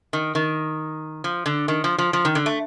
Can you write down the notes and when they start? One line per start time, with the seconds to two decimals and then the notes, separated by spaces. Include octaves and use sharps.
0.13 D#3
0.35 D#3
1.24 F3
1.46 D3
1.68 D#3
1.84 F3
1.98 F3
2.13 F3
2.25 D#3
2.35 D3
2.46 A3